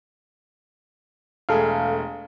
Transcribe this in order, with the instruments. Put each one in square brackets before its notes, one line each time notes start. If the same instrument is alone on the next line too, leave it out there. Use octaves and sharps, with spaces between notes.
[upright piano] E1 A3 G#4 [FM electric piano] A4 F5